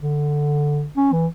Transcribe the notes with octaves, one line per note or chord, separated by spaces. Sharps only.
D3
C#4
E3